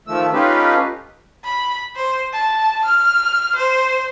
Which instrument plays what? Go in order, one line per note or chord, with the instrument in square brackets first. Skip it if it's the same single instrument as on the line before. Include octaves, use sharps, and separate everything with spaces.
[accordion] D#3 F3 A3 E6
A3 C#4 D#4 F4 G4 B4
[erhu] B5
C5
A5
F6
C5